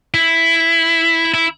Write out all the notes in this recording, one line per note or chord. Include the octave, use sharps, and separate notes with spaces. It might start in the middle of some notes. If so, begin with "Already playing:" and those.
E4
E4